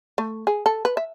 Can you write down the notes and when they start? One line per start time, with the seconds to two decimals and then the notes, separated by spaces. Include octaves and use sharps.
0.18 A3
0.47 G#4
0.66 A4
0.85 B4
0.97 E5